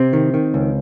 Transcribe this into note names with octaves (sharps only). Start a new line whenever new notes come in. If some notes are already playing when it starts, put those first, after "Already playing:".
Already playing: C3 C4
D#3
D#3
C#2